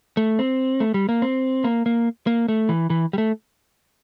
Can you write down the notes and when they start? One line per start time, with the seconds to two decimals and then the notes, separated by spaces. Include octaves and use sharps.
0.17 A3
0.39 C4
0.80 A3
0.94 G3
1.09 A#3
1.22 C4
1.64 A#3
1.86 A#3
2.27 A#3
2.48 A3
2.69 E3
2.90 E3
3.13 G3
3.18 A3